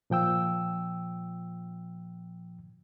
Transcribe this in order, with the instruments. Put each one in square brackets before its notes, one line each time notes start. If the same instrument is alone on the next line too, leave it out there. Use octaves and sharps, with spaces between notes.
[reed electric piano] A#2 F3 G5 E6